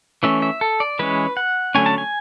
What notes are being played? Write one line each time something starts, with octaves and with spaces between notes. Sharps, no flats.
E3 A3 C#4 E5
E5
A4
D5
E3 G#3 C#4 B4
F#5
D3 F#3 A3 C#4 G#5
A5
G#5